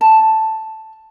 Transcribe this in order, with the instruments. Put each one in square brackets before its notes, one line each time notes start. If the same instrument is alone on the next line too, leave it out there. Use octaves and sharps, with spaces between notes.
[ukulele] A5